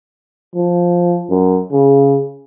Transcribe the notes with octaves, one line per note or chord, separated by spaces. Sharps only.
F3
F#2
C#3